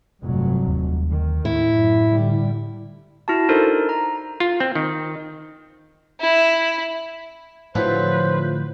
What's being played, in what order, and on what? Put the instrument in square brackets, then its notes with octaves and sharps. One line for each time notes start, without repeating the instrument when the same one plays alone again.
[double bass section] F1 G2 F#3
[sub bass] D#2
[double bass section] D#3
[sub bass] A2 [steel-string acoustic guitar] E4
[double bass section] F#2
D3 G3
[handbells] E4 F#4 A5
D4 D#4 A4 A#4 C5
A#5
[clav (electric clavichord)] F4
C4
D#3
[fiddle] E4
[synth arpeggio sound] A2 D3 F3 [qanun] F#3 E4 F4 [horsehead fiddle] B4 [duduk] C5